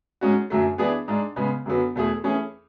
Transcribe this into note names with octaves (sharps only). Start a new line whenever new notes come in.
G#2 G#3 C#4 F#4
F#2 D3 F#3 A3
E3 B3 D4 G#4
G#2 G#3 D4
C#3 G#3 B3
F#2 D3 F#3 B3
E2 B2 A3 E4 G#4
E3 A3 C#4 G#4